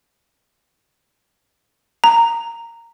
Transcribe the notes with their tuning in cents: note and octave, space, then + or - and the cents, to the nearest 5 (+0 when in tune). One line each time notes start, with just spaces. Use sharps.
A#5 -10